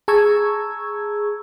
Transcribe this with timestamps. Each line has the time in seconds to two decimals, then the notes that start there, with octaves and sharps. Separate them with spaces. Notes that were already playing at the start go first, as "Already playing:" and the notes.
0.08 G#4 A5 A#5 C#6 E6 G#6